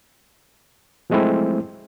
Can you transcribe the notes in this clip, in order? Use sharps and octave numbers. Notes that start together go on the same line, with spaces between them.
F3 F#3 G#3 A3 C4 E4